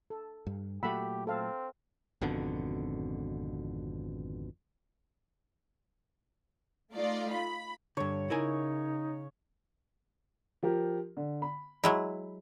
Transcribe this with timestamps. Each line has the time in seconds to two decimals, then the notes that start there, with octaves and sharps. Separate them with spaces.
0.10 A4
0.47 G2
0.83 A#2 F#3 A3 G4 F#5 B5 E6
1.27 C4 A4 F5
2.21 G#1 F2 B2 D3
6.94 A3 D#4 F4 D5
7.32 B5
7.97 G2 D3 C#5
8.30 C#3 D#4 E4 A#4 G#5
10.63 F3 G4 A#4
11.17 D3
11.42 B5
11.84 F#3 G#3 E4